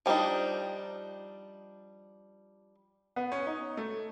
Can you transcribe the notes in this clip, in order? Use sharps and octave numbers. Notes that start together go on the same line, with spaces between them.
F3 G3 B3 D4 D#4
B3
C#4
D#4
A3